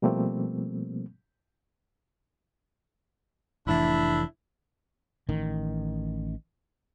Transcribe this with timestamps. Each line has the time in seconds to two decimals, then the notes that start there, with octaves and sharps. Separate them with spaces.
0.02 B2 F3 G3 A3 A#3 C4
3.67 F1 A2 E3 D4 E4 E5
5.29 A1 D#3